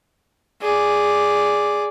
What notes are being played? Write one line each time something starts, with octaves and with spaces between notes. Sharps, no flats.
G#4 D5